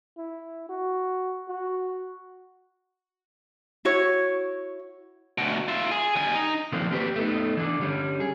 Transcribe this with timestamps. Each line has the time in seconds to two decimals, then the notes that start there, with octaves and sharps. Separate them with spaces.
0.17 E4
0.69 F#4
1.48 F#4
3.85 E4 F#4 C#5
5.38 D2 B2
5.68 F4 E5
5.91 G#4
6.16 G3 G#5
6.35 D#4
6.72 D3 D#3 F3 A#3 C4 D4
6.91 A#3 C4 G4 A#4 B4
7.16 A3 B3 D#4
7.57 E3 D4
7.79 D3 G3 C#4
8.20 G#4